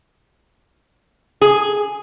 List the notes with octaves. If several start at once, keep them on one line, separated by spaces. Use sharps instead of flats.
G#4